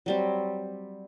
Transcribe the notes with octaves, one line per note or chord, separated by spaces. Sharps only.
F#3 G3 C4